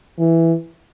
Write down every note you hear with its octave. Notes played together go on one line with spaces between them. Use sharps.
E3